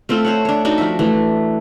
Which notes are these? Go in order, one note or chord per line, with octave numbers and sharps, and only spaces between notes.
A3 C4 F4 A4
C5 C#5 F#5
D4 C#5
D4 D#4 F#4
F3 F#4 E5
E3 A3